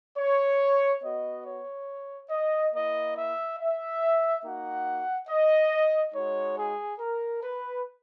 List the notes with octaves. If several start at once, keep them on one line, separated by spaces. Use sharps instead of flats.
C#5
B3 F#4 D#5
C#5
D#5
A#3 E4 D#5
E5
E5
A#3 D#4 F#4 F#5
D#5
G#3 D#4 F#4 C#5
G#4
A#4
B4